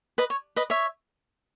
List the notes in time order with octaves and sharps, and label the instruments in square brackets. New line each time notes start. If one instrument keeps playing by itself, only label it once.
[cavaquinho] B4 D#5
C#5
B4 D#5
C#5 E5